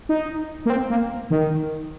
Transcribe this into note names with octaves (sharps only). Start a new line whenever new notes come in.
D#4
A#3
C4
A#3
D#3